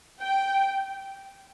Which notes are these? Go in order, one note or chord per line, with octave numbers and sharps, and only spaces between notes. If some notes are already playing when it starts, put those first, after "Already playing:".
G5